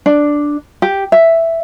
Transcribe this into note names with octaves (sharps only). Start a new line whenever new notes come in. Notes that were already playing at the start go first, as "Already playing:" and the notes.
D4
G4
E5